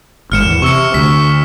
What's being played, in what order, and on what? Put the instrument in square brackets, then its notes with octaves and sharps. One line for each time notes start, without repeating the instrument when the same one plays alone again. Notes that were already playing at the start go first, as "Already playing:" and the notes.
[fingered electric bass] G#1 G#2 [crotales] F6 C#7 E7
[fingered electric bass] E2
[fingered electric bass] C3 [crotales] C#6 E6 C#7
[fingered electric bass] D2 [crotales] B6